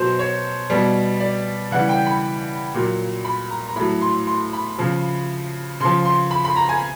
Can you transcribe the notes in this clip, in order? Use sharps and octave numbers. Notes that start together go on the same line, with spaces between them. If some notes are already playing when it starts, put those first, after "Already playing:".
Already playing: B2 F#3 C5
C#5
B2 G3
D5
C#3 E3 G3 F#5
G5
B5
A#2 F#3
B5
A#5
A#5
A2 F#3 B5
C6
C6
B5
C#3 F3
C#3 F3 C6
C6
B5
B5
A#5
G#5